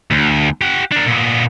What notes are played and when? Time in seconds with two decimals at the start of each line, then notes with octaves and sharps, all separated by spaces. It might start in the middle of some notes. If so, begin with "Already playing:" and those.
0.11 D2
0.61 G4 F#5
0.91 D4 A#4
1.07 A#2 B3